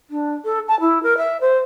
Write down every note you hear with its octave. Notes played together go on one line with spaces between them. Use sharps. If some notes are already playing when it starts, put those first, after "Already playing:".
D4
A4
A5
E4
A#4
E5
C5